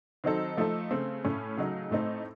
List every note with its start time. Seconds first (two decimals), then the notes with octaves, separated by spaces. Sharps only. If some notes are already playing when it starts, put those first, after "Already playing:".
0.24 D#3 F#3 C4 D#4 A4
0.57 F3 A3 D#4 A4
0.91 C#3 A3 C4
1.25 A2 A3 C#4
1.57 C#3 F#3 A3 D#4
1.91 A2 A3 C4 D#4 A4